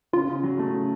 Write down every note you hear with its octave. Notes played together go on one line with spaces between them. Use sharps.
C#3 F4
C#3
F#3
A3
C#3